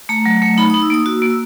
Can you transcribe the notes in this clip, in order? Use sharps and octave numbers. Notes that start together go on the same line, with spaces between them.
A3 A#5
F#3
A3
D#4 B5
D#4 D#6
E6
A#3 D#6
F#4 E6
A#3
E6